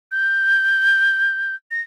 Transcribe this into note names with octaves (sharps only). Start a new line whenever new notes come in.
G6
A#6